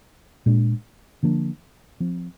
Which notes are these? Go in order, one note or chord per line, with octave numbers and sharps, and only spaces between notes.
A#2 G#3 D4
D3 F3 A#3 D4
F3 C4